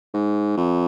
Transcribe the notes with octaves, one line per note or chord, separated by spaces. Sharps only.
G#2
F2